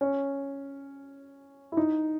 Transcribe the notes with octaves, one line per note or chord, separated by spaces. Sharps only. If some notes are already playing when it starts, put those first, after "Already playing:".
C#4
E4
D#4